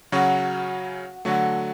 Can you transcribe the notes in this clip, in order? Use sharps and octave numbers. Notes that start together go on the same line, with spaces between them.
C#3 F#3 C#4 F#4
D3 F#3 A3 F#4